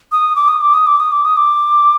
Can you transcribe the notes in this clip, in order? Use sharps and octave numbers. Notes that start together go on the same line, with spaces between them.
D#6
D6
D#6
D6
D#6
D6
D#6
D6
D#6
D6